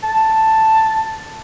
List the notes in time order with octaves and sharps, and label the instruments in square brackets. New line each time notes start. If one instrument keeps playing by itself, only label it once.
[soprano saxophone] A5